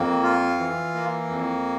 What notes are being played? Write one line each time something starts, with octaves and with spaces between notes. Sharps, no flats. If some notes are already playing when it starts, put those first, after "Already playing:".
Already playing: F2 A#3
F4
E3
A#3
F2